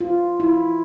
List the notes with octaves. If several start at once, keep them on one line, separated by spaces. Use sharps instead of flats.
F4
E4